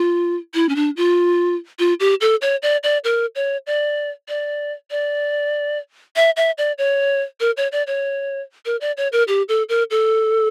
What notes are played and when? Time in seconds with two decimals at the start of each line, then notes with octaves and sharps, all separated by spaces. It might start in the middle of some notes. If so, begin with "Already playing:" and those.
Already playing: F4
0.54 E4
0.69 C#4
0.76 D4
0.97 F4
1.79 F4
2.00 G4
2.21 A4
2.42 C#5
2.62 D5
2.83 D5
3.04 A#4
3.35 C#5
3.67 D5
4.29 D5
4.91 D5
6.16 E5
6.37 E5
6.58 D5
6.78 C#5
7.40 A#4
7.57 C#5
7.72 D5
7.87 C#5
8.66 A#4
8.81 D5
8.97 C#5
9.12 A#4
9.28 G4
9.49 A4
9.69 A#4
9.91 A4